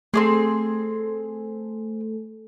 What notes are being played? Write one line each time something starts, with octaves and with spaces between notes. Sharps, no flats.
A3 C4 D4 G#4 A4